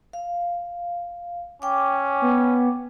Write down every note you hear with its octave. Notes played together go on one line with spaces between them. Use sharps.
F5
C#4 G5 D6
B3